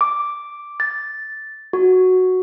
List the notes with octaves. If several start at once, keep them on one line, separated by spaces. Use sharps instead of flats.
D6
A6
F#4